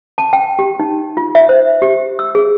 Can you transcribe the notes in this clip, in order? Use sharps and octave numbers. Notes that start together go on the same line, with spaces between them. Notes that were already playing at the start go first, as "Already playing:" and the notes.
A5
G5
G4
D#4
F4
E5
C5
G4
E6
G#4